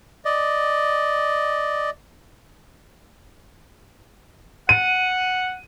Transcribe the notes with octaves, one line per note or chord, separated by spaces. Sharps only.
D5 D#5
F#5 D#7